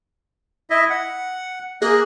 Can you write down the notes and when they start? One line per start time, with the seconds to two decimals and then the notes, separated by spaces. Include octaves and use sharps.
0.70 E4 D#5 E5
0.90 F#5
1.82 A#3 G#4 D#5 F#6